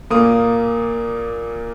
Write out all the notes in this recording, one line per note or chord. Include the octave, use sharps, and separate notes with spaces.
A#2 A#3 D#6